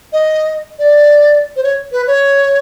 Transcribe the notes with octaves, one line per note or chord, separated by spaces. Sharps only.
D#5
D5
C5
C#5
B4
C#5